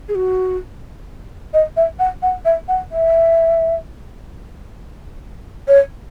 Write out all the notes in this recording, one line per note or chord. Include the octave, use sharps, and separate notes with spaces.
G#4
F#4
D#5
E5
F#5
F#5
E5
F#5
E5
C#5